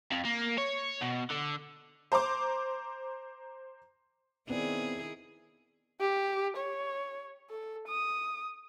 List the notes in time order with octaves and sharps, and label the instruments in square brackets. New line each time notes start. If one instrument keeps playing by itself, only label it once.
[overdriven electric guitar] F2
A#3
C#5
B2
D3
[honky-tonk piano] C5 A#5 C6 D6
[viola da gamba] D#3 E4 G#4 [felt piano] B3 C4 D5
[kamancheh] G4
C#5
A4
D#6